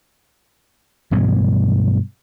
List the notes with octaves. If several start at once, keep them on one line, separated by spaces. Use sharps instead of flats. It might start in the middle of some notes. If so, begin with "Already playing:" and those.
G2 B2 E3 F#3